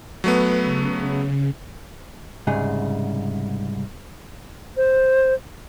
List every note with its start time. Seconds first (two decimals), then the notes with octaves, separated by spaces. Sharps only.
0.24 F#3 A3 B3 B4
0.63 C#3
2.47 C2 G#2 C#3 G#4
4.77 C5